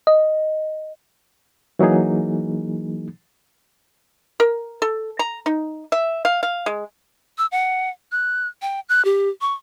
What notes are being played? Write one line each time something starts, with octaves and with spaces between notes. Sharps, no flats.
D#5
E3 F#3 A#3 D#4 G#4
A#4
A4
A#5
D#4
E5
F5
F5
G#3
E6
F#5
F#6
G5
F#6
G4
C#6